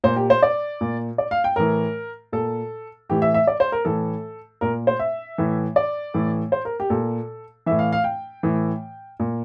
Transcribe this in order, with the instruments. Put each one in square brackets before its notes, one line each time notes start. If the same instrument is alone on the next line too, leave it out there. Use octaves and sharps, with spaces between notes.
[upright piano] A#2 C5
G4
C5
D5
A#2
D5
F5
G5
A2 E3 A#4
A#2 A4
A2 E3 G4
E5
E5
D5
C5
A#4
A2 E3 A4
A#2 A#4
C5
E5
A2 E3
D5
A2 E3
C5
A#4
G4
A#2 A4
E3 E5
A2
F5
F5
G5
A2 E3
A#2